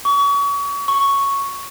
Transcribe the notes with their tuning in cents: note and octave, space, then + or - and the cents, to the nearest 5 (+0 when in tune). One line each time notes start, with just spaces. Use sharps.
C#6 +35
C#6 +0